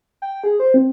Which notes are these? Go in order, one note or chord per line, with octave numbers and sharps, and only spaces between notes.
G5
G#4
C5
C4